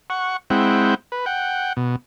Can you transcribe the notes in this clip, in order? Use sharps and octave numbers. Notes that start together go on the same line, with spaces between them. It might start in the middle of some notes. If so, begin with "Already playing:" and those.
F#5 C#6
G#3 C4 E4 F#5 G5
B4
F#5 G5
B2